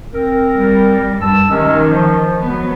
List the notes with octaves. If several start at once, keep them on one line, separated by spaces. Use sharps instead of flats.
C4 A#4
G3
G2 A5 E6
C3 D#3 G#3 C#4
F3
F#3 B3